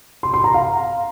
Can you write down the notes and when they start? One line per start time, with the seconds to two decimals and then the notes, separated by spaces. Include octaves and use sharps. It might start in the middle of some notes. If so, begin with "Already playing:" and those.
0.23 C6
0.34 C6
0.44 A#5
0.54 F5